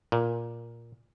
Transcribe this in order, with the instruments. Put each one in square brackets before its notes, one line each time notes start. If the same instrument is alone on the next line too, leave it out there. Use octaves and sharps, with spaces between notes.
[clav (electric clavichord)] A#2